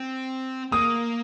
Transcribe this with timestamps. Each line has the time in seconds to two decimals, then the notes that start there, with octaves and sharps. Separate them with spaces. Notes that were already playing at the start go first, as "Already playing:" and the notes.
Already playing: C4
0.72 A#3 D#6